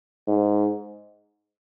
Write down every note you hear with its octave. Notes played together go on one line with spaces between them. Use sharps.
G#2